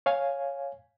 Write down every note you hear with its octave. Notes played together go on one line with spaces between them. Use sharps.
C#5 F5 G#5